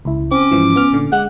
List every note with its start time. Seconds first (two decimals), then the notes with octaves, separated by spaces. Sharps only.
0.05 C#2 E4
0.31 C4 C#4 D6
0.51 G#2 E3 F3
0.76 B3 F6
0.93 A#2 D3
1.12 G#3 F#5